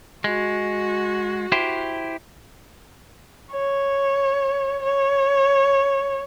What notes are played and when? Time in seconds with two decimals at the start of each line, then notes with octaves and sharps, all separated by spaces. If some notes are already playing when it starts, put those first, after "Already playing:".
0.24 G#3 F#4
1.52 E4 G4 C5
3.52 C#5
4.83 C#5